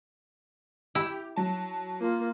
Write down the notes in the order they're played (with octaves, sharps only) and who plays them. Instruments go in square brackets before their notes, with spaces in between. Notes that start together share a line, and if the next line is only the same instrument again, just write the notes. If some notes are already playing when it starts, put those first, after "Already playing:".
[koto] E4 [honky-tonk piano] G4
[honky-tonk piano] F#3 A5
[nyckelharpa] A#3 [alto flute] F4